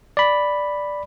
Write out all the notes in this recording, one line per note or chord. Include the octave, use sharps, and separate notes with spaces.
D5 B5